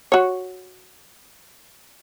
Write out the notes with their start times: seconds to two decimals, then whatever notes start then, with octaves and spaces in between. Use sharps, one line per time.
0.12 F#4 C#5